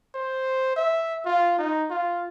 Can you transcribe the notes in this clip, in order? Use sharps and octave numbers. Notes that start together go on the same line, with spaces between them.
C5
E5
F4
D#4
F4